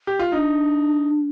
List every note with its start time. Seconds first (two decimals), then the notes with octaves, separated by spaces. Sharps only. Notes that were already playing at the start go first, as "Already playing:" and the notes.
0.07 G4
0.19 F4
0.32 D4 D#4